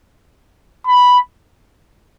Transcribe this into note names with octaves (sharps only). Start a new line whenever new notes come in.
B5